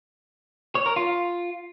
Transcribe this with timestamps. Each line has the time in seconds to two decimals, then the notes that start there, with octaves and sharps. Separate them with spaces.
0.75 C#5
0.86 A#4
0.96 F4